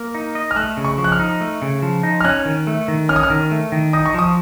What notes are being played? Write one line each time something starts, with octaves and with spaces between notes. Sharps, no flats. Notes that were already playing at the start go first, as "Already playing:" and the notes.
Already playing: A#3
D#4
D#5
F6
A3 F#6
C#3
C#6
F3
F#6
F6
D#4
A3
C#3
F3
D#4
F6
C#4 F#6
D#3
A3
D#3
C#4 F6
D#6
F6
D#3
A3
D#3
D#4 D#6
C#6
F3 D#6